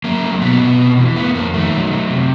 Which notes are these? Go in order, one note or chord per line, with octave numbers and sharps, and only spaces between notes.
F#3 A#3
A3
B2 B3
B2
C3
E3
A3 B3
F2 A#3
D#3 A3
F#3
A3
C3